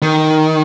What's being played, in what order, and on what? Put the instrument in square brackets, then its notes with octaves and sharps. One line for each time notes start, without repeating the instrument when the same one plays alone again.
[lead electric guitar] D#3